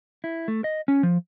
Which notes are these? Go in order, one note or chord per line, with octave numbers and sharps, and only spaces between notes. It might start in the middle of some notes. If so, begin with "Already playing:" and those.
E4
A3
D#5
C#4
F3